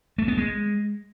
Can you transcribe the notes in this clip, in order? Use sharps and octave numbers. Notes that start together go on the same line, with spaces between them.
A3
B3
G#3